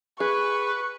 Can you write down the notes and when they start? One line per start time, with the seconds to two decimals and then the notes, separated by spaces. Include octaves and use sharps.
0.20 G#4 B4 C#6